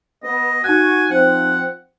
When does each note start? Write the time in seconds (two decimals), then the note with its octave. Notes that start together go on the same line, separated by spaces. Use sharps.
0.24 B3 D#5
0.64 D#4 F#4 F#5 G#5 F#6
1.11 F3 C4 F#5